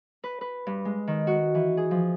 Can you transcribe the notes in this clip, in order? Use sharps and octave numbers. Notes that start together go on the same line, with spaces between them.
B4
B4
G2
G#3
D#3
F#4
E3
G#4
F3